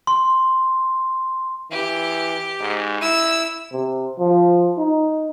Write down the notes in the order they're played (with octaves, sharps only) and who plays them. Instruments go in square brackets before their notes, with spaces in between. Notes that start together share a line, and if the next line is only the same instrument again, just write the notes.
[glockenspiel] C6
[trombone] E3 [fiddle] G4
[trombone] G#2
[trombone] E4 [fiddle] E6
[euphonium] C3
F3
D#4